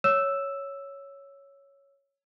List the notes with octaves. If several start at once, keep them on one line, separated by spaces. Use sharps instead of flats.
C#5 E6 E7